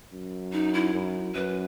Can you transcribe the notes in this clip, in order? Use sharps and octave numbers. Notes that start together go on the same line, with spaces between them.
F#2
D#4
E4
F#2
F#2 B4